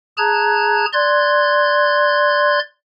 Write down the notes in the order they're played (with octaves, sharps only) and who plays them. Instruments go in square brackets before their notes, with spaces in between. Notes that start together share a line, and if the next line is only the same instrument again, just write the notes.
[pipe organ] G#4 A5 A#5 F#6 G#6
D5 C6 F#6 G#6